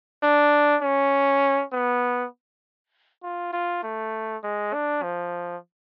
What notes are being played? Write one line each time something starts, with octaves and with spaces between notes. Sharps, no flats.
D4
C#4
B3
F4
F4
A3
G#3
D4
F3